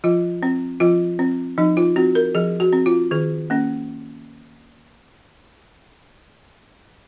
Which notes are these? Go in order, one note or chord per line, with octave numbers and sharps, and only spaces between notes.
F3 F4
C4
F3 F4
C4
F3 D#4
F4
C4 F#4
A#4
F3 G#4
F#4
C4
F4
D#3 G#4
A#3 C#4